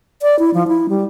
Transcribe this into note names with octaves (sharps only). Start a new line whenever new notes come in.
D5
E4
F3
E4
G3